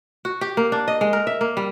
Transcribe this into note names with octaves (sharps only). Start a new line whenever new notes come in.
F#4
G4
A#3
D4
D#5
G#3
A#4
E5
A#3
G3